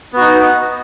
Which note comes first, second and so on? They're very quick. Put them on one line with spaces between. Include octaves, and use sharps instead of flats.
B3 F#4 D#4